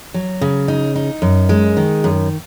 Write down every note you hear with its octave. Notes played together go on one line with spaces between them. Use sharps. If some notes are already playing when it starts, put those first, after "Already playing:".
F#3
C#3
D#4
D#4
F#2
G#3
D#3
F#2